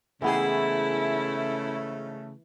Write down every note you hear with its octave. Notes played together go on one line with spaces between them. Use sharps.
G#2 C#3 E3 A3 B3 E4 G#4 G5